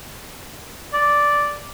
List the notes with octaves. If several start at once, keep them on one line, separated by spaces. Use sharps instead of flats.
D5